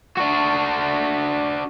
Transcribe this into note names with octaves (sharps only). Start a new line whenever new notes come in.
D4 F#4